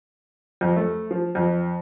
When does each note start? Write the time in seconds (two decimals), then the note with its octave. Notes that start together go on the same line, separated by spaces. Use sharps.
0.61 F2
0.76 A3
1.11 F3
1.35 F2